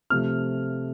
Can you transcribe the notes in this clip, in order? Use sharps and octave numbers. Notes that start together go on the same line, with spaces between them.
C3 F3 A3 C4 F6